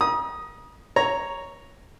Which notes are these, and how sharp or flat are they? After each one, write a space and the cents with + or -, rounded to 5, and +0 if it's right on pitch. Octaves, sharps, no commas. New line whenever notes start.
A#5 +40 D#6 +0
C#5 +0 A#5 +0